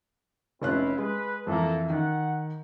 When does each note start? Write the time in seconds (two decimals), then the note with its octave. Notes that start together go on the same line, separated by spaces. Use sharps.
0.62 F1 C4 C#4 E4 F4 F#6
0.98 G#3 B4
1.47 F2 E3 A#3 A4
1.90 D#3 F#5